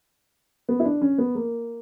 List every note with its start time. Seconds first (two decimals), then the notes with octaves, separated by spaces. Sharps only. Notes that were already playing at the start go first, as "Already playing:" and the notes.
0.69 B3
0.80 E4
0.85 D4
1.01 C#4
1.18 B3
1.35 A#3